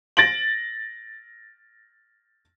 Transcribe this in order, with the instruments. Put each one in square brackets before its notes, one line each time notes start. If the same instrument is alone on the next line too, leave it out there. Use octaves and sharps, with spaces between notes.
[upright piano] A6 A#6 D7 F#7